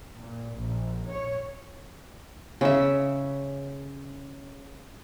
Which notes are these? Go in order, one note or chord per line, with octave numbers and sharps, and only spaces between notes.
A#2
A#1
C#5
C#3 E5